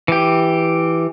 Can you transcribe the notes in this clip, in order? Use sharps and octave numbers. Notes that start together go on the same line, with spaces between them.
E3 G4